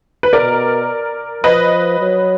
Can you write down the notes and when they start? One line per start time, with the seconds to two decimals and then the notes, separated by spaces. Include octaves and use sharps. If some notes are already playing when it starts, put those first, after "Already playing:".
0.23 B4
0.33 B2 A#4 D5
1.44 F3 B4 D#5
1.99 F#3